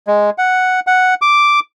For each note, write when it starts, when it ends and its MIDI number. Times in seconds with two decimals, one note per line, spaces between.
0.07 0.30 56
0.38 0.80 78
0.87 1.14 78
1.22 1.60 86